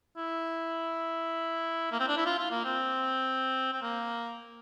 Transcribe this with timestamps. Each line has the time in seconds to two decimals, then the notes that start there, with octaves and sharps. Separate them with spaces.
0.17 E4
1.92 A#3
2.00 C4
2.08 D4
2.17 E4
2.26 F4
2.39 F4
2.51 A#3
2.65 C4
3.72 C4
3.82 A#3